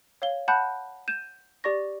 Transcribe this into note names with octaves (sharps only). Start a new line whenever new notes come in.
C#5 F5 G7
F#5 A5 B5 F#6 G6
G6 D#7 E7
G4 D5 C#6 A#6